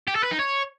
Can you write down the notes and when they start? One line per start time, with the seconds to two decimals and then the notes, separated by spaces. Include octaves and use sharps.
0.08 G4
0.15 A4
0.23 B4
0.31 D#4
0.39 C#5